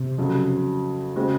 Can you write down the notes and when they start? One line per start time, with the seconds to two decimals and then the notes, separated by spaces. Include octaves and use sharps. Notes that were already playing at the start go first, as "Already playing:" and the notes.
Already playing: C3
0.18 F2 C#3 F#3
1.16 C#3 G#3 C4 F#4